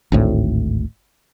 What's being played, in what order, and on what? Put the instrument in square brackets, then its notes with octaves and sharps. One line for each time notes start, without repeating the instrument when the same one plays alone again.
[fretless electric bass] G#1 D2 A2